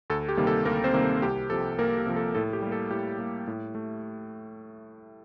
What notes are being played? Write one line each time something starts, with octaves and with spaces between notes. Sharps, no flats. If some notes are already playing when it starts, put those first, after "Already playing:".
D2 A4
G4
C3 D#3 G3 A#3
A4
D2 A#3 A#4
C4 C5
C3 D#3 G3 A#3
A4
C2 G4
C3 F3 A4
C2 A#3 A#4
G4
C3 F3
A4
A2 A4
G4
G3 A#3
A4
A2 G4
G3 A#3
A2
A3